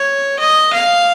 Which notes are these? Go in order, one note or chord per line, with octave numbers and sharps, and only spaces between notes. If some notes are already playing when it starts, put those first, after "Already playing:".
Already playing: C#5
D#5
F5